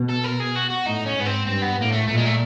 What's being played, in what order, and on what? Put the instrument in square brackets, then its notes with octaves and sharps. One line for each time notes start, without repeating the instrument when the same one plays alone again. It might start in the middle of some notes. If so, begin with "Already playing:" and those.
Already playing: [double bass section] B2
[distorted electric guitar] A4
A#4
G#4
F#4
F#4
[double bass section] A2 [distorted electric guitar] D#4
[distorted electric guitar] C#4
[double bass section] G#2 [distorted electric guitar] B3
[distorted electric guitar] C4
[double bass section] G2 [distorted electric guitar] C4
[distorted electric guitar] B3
[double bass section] A2 [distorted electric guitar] A#3
[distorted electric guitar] A3
[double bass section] A#2 [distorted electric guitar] A3
[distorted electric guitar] G#3
A3